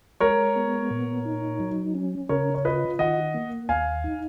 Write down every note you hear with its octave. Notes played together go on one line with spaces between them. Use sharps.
G#3 A#4 C#5
B3
A#2
D#4
F#3
C#4
C#3 A#4 C#5
C#5
F4 B4 D#5
D#3 D#5 F#5
A#3
D#2 F5 G#5
D#4